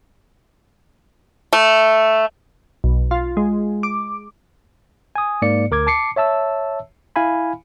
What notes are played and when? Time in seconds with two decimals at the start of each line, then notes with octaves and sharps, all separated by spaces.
1.53 A3
2.84 B1
3.11 F4
3.37 G#3
3.83 D6
5.16 G#5 D#6
5.42 G#2 A#3 D5 C#7
5.71 D2 A#4 D6 G#6
5.87 A5 D6 C7 C#7
6.16 C#5 E5 A5 E6
7.16 E4 F5 G#5 B5